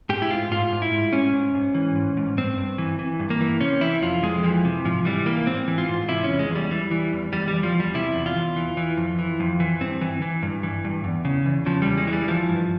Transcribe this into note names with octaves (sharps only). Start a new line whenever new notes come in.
G#2 G4
E4
G#2 F4
G#2 F4
G#2
E4
G#2
G#2 C#4
G#2
G#2
E3
G#2
G#2
G2 C4
G2
E3
E3
G2
A#3
E3
C3 C#4
E3 E4
F2 F4
F2 G#3
E3 F3
C3
G#2 F3
E3 G3
E3 A#3
G#2 C4
E3
F4
G#2
C3 E4
C#4
E2
G#3
E2
G3
E3
E3
E2
E2 G3
G3
E2
F3
E2
G3
C3 E4
E2
F4
E2
E3
E3
F2
E3
F2
E3
G2 C4
E3
E3
G2
E3
G2
E2
C#3
E2
C#3 F3
E2 G3
G#3
E3
G3
E3 F3
G2